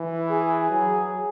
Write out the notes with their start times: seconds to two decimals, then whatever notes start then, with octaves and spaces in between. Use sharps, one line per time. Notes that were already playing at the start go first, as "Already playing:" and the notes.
Already playing: E3
0.31 G#4
0.71 F#3